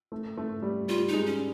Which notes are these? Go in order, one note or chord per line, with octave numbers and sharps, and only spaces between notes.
A3
A3
G3
G3 F4
D#4
G#3
C#4